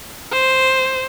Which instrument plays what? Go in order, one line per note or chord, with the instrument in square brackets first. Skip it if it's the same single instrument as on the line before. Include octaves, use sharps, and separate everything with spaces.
[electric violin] C5